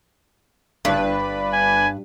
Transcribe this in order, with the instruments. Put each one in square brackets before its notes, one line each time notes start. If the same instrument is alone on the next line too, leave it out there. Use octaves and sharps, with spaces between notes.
[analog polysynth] G1 D4 B4 [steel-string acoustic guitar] G2
[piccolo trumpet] G#5